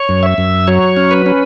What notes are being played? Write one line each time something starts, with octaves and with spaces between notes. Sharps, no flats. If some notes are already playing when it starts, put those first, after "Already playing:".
Already playing: C#5
F#2
E5
F#2
F#3 C#5
C#4
B4
C#4